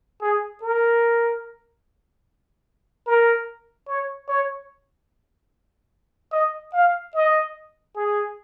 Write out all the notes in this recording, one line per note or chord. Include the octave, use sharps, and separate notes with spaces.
G#4
A#4
A#4
C#5
C#5
D#5
F5
D#5
G#4